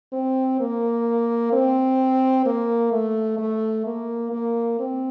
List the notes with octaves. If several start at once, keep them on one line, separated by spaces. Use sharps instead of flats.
C4
A#3
C4
A#3
A3
A3
A#3
A#3
C4